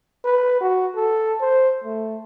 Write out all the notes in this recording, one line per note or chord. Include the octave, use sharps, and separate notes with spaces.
B4
F#4
A4
C5
A3